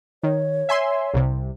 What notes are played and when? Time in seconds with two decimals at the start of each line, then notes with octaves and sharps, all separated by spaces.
0.23 D#3 C#5
0.69 E5 G#5 C6
1.14 C2 C3